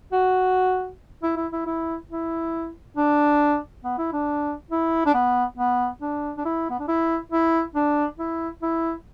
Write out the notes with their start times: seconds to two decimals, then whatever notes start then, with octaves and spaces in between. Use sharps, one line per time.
0.12 F#4
1.23 E4
1.37 E4
1.52 E4
1.66 E4
2.10 E4
2.97 D4
3.84 B3
3.98 E4
4.13 D4
4.71 E4
5.06 D4
5.14 B3
5.57 B3
6.01 D4
6.38 D4
6.45 E4
6.70 B3
6.79 D4
6.88 E4
7.32 E4
7.75 D4
8.18 E4
8.62 E4